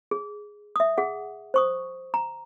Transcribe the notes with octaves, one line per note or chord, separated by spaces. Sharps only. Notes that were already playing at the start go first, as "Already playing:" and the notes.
G#4
E5 D#6
G#4 F#5
C5 C#6 D#6
A#5